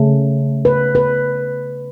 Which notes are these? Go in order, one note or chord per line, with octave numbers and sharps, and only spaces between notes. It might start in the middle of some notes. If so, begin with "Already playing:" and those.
Already playing: C#3 A3
B4
B4